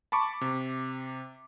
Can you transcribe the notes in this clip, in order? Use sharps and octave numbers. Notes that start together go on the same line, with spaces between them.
A5 B5 C#6 D6
C3